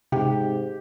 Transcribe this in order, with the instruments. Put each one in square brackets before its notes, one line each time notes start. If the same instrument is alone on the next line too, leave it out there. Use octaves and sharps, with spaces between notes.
[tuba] G#2 [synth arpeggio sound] C3 [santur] G4